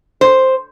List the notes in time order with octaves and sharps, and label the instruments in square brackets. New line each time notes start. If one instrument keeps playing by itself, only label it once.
[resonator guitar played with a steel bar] C5